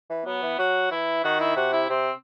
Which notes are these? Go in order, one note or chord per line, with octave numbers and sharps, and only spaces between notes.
E3
F#3 B3
E3
F#3 F#4
E3 E4
D#3 F#4
E4
C3 F#4
E4
C3 C4